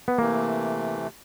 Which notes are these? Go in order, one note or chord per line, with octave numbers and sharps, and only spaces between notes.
B3
C3 E3 A3 A#3